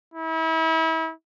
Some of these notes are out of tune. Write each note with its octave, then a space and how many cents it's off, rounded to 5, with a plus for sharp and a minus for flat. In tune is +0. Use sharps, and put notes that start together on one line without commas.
E4 -35